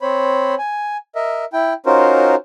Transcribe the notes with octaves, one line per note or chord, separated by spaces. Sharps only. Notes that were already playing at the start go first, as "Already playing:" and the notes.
C4 C5 C#5 B5
G#5
A#4 D#5 E5
E4 G5
C#4 D#4 F4 F#4 A#4 C5